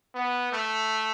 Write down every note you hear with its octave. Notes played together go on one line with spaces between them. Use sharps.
B3
A3